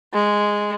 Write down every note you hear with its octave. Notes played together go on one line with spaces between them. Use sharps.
G#3